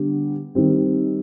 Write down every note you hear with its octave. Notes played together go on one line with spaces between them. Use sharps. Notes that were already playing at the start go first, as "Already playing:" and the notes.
Already playing: D3 G3 B3 G4
D#3 G3 C4